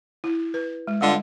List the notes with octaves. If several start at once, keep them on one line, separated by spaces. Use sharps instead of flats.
E4
B4
G#3
D3 G3 B3 F4 D#5